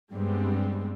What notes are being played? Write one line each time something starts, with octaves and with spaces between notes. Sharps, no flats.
G2 G3 G#3 B3 C4